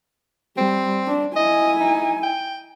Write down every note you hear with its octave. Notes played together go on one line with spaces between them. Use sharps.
G3 C4
D4
E4 D#5 G#5
D#4
G5